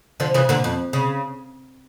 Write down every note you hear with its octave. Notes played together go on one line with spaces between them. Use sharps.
D3 F3
C#3 E3
A#2 D3
F2
C#3